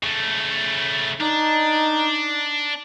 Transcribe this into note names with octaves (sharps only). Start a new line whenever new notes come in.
C#3 A3
D4 D#4